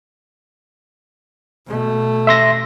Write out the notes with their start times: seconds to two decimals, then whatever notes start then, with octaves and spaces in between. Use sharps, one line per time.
1.66 B2 A3
2.27 E5 C6 A#6